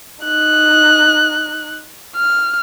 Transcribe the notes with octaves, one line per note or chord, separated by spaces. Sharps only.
D#4 F#6
F6